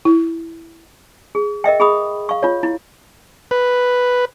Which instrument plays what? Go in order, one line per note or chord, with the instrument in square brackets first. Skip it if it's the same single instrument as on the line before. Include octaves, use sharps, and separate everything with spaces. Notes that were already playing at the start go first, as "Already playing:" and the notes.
[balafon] E4
[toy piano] G#4
A#4 D#5 E5 G5
G#4 B5 D#6
F5 C#6
F4 C#5
E4
[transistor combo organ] B4